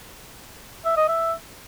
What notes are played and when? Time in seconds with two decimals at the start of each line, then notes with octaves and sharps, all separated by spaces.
0.85 E5
0.97 D#5
1.08 E5